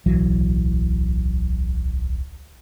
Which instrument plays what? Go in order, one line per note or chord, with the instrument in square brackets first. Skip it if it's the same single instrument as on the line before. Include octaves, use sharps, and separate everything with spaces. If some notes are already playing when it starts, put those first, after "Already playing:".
[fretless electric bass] D1 B1 E3 F#3